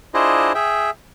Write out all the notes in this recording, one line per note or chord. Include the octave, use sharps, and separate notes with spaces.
D4 E4 F4 G#4 C5 D#5
G#4 E5 G5